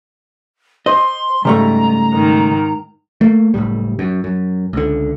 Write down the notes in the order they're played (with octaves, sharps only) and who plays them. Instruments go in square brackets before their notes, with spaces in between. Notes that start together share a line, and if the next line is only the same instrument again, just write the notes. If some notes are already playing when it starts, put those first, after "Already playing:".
[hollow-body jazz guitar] C5 D#5 [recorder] C6
[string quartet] G#2 [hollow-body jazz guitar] C#3 G3 A3 [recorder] A#5
[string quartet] G#2 D#3
[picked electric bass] A3 A#3
F#1 C2 A2 G3
F#2
F#2
C#2 D3